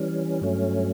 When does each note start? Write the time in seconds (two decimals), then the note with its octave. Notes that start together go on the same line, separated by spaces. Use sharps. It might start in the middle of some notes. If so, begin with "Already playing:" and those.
Already playing: E3 G3 C#4
0.41 G2 F#3 A3 C#4